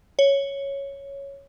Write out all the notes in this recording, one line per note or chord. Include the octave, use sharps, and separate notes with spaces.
C#5